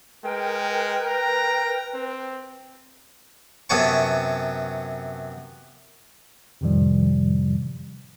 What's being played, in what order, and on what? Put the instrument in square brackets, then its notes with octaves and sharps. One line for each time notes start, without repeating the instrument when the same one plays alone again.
[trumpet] G#3 [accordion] A#4 G5 [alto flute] B4
[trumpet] A#5
C4
[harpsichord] F#2 C3 B3 C#5 A5 C#6
[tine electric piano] F2 A2 C3 D#3 F3 G3